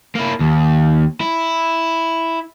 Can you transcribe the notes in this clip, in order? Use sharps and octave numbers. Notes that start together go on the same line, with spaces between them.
A#3 E4
D#2
E4